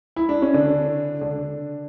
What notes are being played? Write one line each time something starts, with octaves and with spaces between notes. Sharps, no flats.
E4
D4
C#4
D3 D4
D3 D4